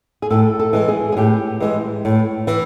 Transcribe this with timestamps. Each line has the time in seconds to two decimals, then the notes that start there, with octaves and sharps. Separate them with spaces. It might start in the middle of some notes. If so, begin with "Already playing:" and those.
0.22 G#4
0.30 A2 A4
0.59 A4
0.73 E3 G#3
0.88 G#4
1.12 G#4
1.17 A2 G4
1.60 E3 G#3
2.05 A2
2.47 E3